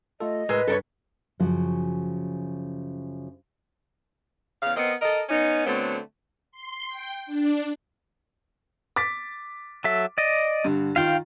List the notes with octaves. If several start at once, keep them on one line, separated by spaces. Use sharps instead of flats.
A3 F4 A4 D#5
A2 G#3 A#4 B4 E6
G2 A4 A#4 C#5
F#2 C#3 F3 F#4
E2 C#3 F5
B3 C4 A#4 D#5
A4 A#4 D#5
B3 C#4 D#4
D3 F#3 A3 B3 C4
C6
G5
D4
D6 A6 B6
F#3 A4 E5
D5 D#5
G2 D3
D#3 F4 F5 G5